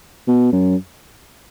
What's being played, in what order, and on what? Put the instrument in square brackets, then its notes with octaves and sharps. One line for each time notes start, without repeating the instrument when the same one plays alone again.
[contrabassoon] B2
F#2